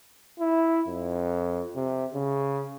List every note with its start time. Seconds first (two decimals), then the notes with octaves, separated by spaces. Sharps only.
0.40 E4
0.88 F2
1.75 C3
2.14 C#3